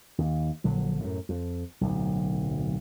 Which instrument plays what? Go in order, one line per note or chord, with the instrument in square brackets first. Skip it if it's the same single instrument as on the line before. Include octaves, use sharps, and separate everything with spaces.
[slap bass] D#2
A#1 D3 F#3
F#2 A2
F2
D1 B1